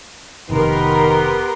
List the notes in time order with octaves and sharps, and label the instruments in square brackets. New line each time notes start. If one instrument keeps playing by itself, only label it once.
[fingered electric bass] F1 C3 [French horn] D#3 [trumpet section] B3 G4 [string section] A#4 C6